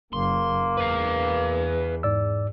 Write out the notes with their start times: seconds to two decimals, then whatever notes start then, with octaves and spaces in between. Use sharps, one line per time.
0.13 F#1 A#3 C6
0.77 E2 B4 F5
2.03 G#2 D5 E6